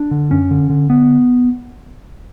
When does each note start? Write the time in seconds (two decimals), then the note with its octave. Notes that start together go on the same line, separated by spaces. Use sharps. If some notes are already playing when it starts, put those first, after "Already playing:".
Already playing: D4
0.11 D3
0.31 F#2 C#4
0.51 D3
0.70 D3
0.90 D3 B3